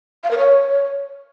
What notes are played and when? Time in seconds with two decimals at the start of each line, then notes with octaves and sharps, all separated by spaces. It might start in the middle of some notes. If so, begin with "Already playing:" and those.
0.24 F5
0.31 A#4
0.38 C#5